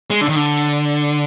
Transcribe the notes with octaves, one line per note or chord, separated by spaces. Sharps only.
G#3
D3
D#3
D3